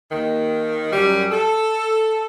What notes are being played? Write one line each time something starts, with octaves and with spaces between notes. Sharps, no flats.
D#2 D#3
F#2 G3
A4